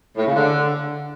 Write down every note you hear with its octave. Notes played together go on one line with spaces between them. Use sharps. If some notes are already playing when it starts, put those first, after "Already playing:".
A2
C#3
D3